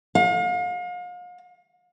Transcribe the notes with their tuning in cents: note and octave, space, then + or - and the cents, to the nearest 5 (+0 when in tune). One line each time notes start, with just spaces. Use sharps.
F5 +40